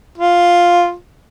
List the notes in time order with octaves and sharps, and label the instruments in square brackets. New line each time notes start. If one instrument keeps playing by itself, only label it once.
[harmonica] F4